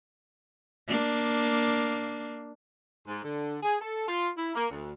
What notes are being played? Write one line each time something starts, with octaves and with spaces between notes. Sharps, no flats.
A#3 D4
G#2
D3
G#4
A4
F4
E4
A#3
D2